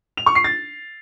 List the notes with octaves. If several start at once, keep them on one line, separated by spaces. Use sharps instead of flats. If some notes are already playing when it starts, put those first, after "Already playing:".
F7
C#6
C7
A6